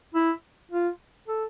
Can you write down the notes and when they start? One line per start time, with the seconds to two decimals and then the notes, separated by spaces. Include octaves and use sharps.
0.14 E4
0.71 F4
1.28 A4